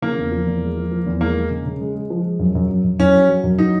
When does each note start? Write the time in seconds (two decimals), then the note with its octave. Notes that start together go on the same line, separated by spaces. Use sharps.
0.02 C#3 A#3
0.17 E2
0.32 F3
0.47 E2
0.62 G#3
0.77 F3
0.91 F3
1.06 E2
1.21 G#3 A#3
1.36 G#3
1.51 C#3
1.66 C#3
1.81 G#3
1.95 G#3
2.10 F3
2.25 G#3
2.39 F#2
2.55 F#2
2.70 F#2
2.84 F#2
2.99 F#2 C#4
3.14 F#3
3.29 F#3
3.44 F#2
3.58 F#3 D#4